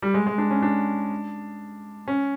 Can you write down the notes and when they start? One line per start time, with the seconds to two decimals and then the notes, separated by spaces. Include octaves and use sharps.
0.02 G3
0.14 G#3
0.27 G#3
0.38 D4
0.51 C#4
0.62 D4
2.08 C#4